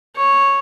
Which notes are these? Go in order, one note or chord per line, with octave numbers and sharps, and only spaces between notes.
C#5